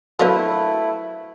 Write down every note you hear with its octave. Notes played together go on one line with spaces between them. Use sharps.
D3 F3 F#3 A3 E4 B4